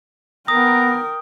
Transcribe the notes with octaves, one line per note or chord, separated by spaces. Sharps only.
B3 A#4 G5 A#5 D#6